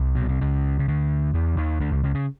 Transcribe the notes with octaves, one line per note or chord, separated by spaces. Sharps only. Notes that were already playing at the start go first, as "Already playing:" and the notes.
Already playing: C2
B2
C3
C#2 C#3
C#3
D2 D3
E2 E3
D#2 D#3
D2 D3
C#2 C#3
C#2 C#3
C#3